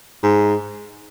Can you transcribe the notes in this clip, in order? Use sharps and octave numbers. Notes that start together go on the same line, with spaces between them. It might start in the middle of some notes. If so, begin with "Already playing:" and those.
G#2